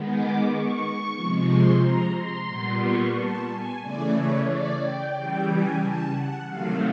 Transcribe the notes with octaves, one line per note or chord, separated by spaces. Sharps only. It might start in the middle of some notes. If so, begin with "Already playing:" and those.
Already playing: D#3 G#3 B3
D6
C#6
C3 F3 G#3
C6
A#5
C6
A#2 G3 B3
C#6
A5
G#5
C#3 E3 A3 D5
C#5
D5
G5
C#3 E3 G3 G5
G#5
A5
F#5
C3 D#3 F#3 A3 F5